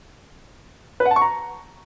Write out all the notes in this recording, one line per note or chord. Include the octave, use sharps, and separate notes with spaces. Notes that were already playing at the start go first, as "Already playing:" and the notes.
B4
F#5
A5
C#6
A#5